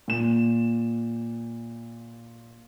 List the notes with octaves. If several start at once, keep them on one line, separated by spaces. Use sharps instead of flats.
A#2 E7